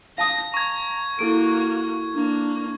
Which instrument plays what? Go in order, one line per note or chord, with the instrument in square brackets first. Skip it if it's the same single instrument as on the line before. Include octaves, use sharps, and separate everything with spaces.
[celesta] F5 A5 D#6 [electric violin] A#6
[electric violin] A#5 [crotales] C#6 G#6
[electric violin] A#3 F#4 [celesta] E4 A4 D7
[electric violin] A#3 [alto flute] D4